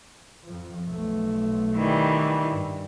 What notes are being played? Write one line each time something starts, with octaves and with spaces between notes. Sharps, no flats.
F2 F3
B1 A3
D#3 E3 G3
G2